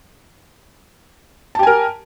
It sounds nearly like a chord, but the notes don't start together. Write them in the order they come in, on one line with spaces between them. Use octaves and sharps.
A5 G4 G#5 A#4